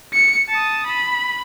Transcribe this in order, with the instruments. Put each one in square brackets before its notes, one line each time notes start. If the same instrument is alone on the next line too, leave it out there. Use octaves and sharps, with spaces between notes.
[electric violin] C#7
A5 D#6
B5